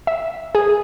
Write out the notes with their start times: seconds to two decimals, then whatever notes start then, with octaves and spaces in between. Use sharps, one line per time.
0.07 E5
0.55 G#4